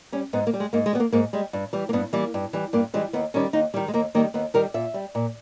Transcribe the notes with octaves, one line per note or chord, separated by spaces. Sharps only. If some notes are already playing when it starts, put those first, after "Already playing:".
G3 C#4
G#2 B3
A#3
G3
G#3
G#2 A#3
G#3
G3 B3
A#3
G#2 A#3
G3 G#3
G2
E3 G3
A#3
G2 B3
E3 G3 A#3
G2
E3 G3
G2 A#3
E3 G3 G#3
D#2 B3
D#3 G3 C#4
D#2 D#4
D#3 G3 E4
G#3
D#2 A#3
D#3 G3 A#3
D#2 B3
D#3 G3 A#4
A#2 E5
G3
A#2